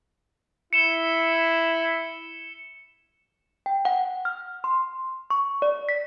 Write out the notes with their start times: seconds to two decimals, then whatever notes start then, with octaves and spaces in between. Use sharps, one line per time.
0.73 E4 C#7 E7 G7
3.66 G5
3.85 F#5
4.25 F6
4.64 C6
5.30 C#6
5.62 D5
5.89 B6